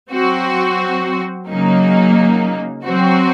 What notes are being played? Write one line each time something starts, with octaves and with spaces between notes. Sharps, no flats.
F#3 C4 F#4
C#3 F#3 A#3 D#4
F#3 C4 F#4